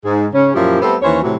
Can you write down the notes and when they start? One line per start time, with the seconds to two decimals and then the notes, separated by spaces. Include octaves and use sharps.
0.04 G#2 G#4
0.33 C#3 C#4
0.54 F#2 A#2 F3 E4 G4
0.81 G3 A3 B3 C4 A4 C5
1.02 D#2 E3 C#4 C5 C#5
1.22 A2 C3 E3 F#3